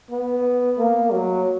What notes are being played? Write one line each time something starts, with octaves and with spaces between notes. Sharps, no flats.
B3
A#3
F#3